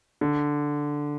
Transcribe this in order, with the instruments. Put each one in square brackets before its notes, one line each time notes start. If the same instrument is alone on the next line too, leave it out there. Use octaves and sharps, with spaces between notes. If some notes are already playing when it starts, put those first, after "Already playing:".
[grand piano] D3